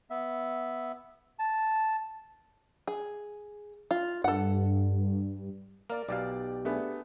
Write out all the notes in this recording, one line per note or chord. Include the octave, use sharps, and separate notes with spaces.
B3 E5
A5
G#4
F4
G2 A4 F#5
A#3 A#4 D5
B1 B2 G4 D5 F5
A3 B3 D4 G#4